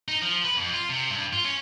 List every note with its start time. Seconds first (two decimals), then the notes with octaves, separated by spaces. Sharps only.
0.08 D#4
0.22 F3
0.44 B4
0.57 F2
0.73 F4
0.90 C3
1.10 G2
1.33 F4
1.45 C#4